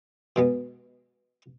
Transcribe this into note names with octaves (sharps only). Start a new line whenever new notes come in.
B2 G#3 B3